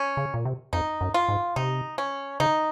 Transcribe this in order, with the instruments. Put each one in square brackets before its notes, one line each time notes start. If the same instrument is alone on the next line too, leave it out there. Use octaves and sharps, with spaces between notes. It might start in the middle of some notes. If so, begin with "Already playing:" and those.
Already playing: [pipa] C#4
[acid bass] C#3
A#2
C3
[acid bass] F2 [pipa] D#4
[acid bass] F#2
[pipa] F4
[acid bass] G#2
[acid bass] C3 [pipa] D#4
[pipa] C#4
[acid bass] C#3 [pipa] D#4